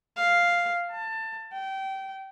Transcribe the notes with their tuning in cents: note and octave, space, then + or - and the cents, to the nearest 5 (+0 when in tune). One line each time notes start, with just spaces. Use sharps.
F5 +0
A5 +20
G5 -25